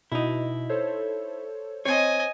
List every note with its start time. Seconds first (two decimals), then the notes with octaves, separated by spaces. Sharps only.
0.12 B2 D#4 E4
0.69 A4 C5 C#5
1.85 C4 C#5 D#5 G#5